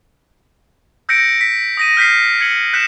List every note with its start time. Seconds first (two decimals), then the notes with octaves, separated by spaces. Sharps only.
1.09 E6 G6 A#6 B6 C#7 D7
1.41 B6
1.77 D#6 A#6 D#7
1.97 F6 G6 B6 C7
2.40 G#6 B6 C#7 F#7
2.73 F#6 G6 B6 C#7 D#7 E7